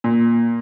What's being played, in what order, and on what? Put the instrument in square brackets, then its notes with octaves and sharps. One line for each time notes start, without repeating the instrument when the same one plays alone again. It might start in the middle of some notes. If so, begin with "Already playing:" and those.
[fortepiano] A#2